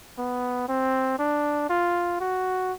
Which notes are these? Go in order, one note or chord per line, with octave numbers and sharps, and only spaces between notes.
B3
C4
D4
F4
F#4